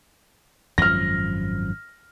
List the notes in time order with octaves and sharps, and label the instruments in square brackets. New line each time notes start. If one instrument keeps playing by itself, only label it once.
[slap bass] G#1 F#2 F3 [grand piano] F6 A#6